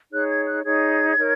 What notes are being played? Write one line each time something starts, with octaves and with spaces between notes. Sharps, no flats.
D#4 G#4 C#5 F#6
G#6
F#6
D#4 G#4 C#5 G#6
D#4 A#4 C#5